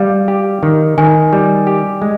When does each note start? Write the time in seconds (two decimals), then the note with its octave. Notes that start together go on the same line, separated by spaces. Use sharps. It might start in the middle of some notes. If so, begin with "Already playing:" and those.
Already playing: G3 F5
0.28 G4
0.63 D#3
0.98 D#3 G#5
1.33 G3
1.67 G4
2.02 G#3